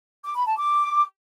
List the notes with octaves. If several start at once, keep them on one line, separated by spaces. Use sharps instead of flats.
D6
B5
A5
D6